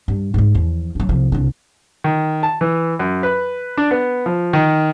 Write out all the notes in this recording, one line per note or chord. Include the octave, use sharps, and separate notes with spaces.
G2
G#2 G#3
E2 F3
F#3 D4
C2 F3
C2 D3
D#3
A5
E3
F#2
B4
D4
B3
F3
D#3